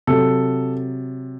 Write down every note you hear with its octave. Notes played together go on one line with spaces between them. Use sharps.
C3 F#3 A4